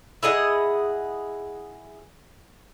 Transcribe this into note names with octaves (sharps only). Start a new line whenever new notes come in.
E4 G#4 D#5 F#5